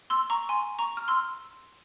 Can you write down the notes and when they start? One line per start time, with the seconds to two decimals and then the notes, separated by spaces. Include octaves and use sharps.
0.10 C6 E6
0.30 A#5 C#6
0.49 G#5 C6
0.79 A#5 C#6
0.97 F6
1.08 C6 E6